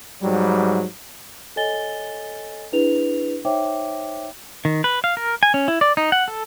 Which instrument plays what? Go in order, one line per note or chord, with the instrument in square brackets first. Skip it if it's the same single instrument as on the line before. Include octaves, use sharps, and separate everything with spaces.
[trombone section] G#2 F#3 G3
[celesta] A4 C#5 D#5 G#5 A6 G7
D4 E4 G#4 B4 F7
D#4 C5 C#5 E5 G5 D6
[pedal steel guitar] D#3
B4
F5
A#4
G#5
C#4
E4
D5
D#4
F#5
A4